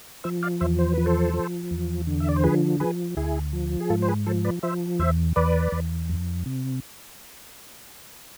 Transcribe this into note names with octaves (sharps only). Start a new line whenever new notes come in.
F3 C5 E5
D5 F5
E2 C5 E5
C5
F3 B4
A4 C5
F3
E2
D3
E5
D5
C5
F3 G#4 B4
F3 G#4 B4
D2 E4 G#4
F3
G#4
G#2 F4 A4
C5
G#4 B4
F3 A4 C5
B4 D5
F3 C5 E5
E2 C5 E5
E2 B4 D5
E2
F2
C3